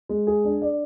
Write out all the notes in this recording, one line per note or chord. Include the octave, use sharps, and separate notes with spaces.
G#3
G#4
D4
D5